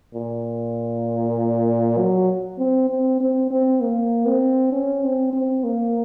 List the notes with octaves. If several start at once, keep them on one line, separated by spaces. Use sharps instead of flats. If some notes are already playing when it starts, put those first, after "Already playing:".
A#2
F#3
C4
C4
C4
C4
A#3
C4
C#4
C4
C4
A#3